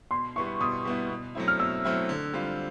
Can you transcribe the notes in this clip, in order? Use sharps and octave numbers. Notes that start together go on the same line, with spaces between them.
B2 C6
G3 B3 E4 C#6
B2 D#6
G3 B3 E4
B2
F#3 A3 C4 E4
F6
B2 E6
F#3 A3 C4 E4
D3
G3 C4 F4